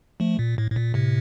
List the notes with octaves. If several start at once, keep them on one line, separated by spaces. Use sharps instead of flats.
F3 A3
A#2
A2
A2
A#2
A2 C3